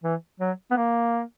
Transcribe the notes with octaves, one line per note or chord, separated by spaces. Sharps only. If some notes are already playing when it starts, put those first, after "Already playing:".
E3
F#3
B3
A#3